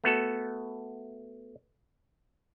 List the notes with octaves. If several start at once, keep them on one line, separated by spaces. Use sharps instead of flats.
A3 B3 F#4 A4